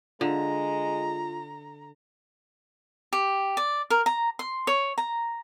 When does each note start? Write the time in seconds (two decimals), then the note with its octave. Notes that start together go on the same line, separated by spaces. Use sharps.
0.21 D3 G#3 F4 A#5
3.13 G4
3.57 D5
3.90 A#4
4.06 A#5
4.39 C6
4.67 C#5
4.98 A#5